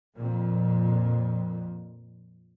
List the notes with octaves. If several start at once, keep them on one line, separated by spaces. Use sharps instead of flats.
F2 A#2